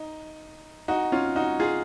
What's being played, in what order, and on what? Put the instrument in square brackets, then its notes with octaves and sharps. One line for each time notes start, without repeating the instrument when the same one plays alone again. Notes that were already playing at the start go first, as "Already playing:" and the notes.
Already playing: [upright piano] D#4
D#4 F#4
C#4 F4
D#4 F#4
F4 G#4